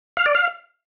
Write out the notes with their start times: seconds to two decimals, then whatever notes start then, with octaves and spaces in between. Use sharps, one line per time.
0.17 F5
0.26 D5
0.35 F5